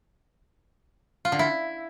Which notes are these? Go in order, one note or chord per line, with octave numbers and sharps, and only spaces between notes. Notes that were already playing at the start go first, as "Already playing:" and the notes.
F4
D3
E4